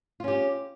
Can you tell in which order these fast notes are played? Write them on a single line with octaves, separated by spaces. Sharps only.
F4 C#4 G4